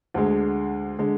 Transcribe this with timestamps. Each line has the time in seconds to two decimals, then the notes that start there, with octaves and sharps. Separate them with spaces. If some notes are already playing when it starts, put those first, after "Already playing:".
0.14 D2 D3 G#3
0.99 D3 G#3